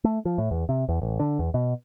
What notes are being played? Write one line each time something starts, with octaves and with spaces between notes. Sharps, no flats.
A3
F3
A2
E2
C3
E2
A1
D3
E2
B2